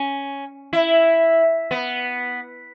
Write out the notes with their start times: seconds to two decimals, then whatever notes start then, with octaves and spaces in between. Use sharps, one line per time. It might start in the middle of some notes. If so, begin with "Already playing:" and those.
Already playing: C#4
0.73 E4
1.71 B3